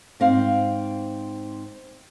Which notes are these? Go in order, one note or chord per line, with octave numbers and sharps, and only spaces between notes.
G#2 C4 F5